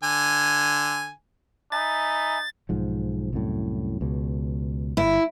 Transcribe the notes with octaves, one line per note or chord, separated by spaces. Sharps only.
D3 G#5
D#4 E5 G#5 B5 A6
B1 G#2 F3
C2 F#2 A2
C#2 B2
G1 E4